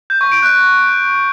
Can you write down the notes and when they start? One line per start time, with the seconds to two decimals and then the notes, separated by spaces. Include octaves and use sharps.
0.10 G6
0.21 C#6
0.32 D7
0.42 F#6